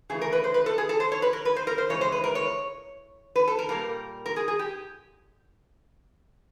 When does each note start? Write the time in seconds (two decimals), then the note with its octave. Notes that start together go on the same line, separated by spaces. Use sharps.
0.10 C#3 E3 A3 G#4
0.22 A#4
0.33 B4
0.44 C5
0.54 B4
0.66 A4
0.78 G#4
0.89 A4
1.00 C5
1.12 C#5
1.22 B4
1.33 A#4
1.45 B4
1.56 C5
1.67 A#4
1.78 C5
1.89 C#3 E3 G#3 C#5
2.01 C5
2.12 B4
2.24 A#4
2.35 C#5
3.36 B4
3.48 A4
3.59 A#4
3.69 A#2 G3 A#3 A#4
4.26 A#4
4.36 G#4
4.48 G#4
4.59 G4